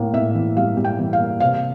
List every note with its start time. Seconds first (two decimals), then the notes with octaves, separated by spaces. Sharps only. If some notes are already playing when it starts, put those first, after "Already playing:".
Already playing: A2 A#3
0.13 A2 E5
0.35 E3
0.57 G3 F5
0.77 G3
0.85 G5
0.99 E3
1.13 F5
1.20 A#3
1.40 C3 F5